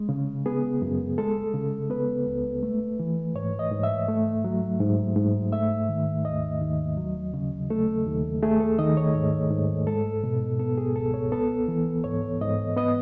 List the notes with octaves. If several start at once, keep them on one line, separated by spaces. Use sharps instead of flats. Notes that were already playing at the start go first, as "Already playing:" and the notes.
Already playing: G#3
C#3
B3 G#4
F#2
G#3 A4
C#3
B3 B4
C#2
A3
E3
G#2 C#5
D#5
G#2
E5
A3
F#3
G#2
G#2
A3 E5
D#3
D#2 D#5
D#2
F#3
C#3
A3 A4
D#2
A3 G#4
A4
D#3 D#5
C#5
G#2
G#2
G#3 A4
B2
B3 A4
G#4
C#2 A4
C#5
B3 A4
E3
G#2 C#5
G#2 D#5
B3 D#5